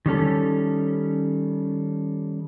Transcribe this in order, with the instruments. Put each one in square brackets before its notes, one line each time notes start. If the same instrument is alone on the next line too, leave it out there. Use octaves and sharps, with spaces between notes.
[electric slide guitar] D#3 G3 C#4 A4